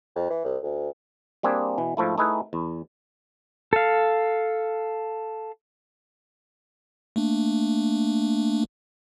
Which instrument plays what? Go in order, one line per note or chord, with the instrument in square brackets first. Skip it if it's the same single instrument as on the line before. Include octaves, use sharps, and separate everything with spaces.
[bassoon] F2
E3
C2
D2
[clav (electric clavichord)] G3 A#3 C4 D4 G#4
B2 E3
G#2 F3 A3 E4
A3 D#4 E4 G#4 B4
E2
[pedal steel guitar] A4 F5
[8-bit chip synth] A3 A#3 D4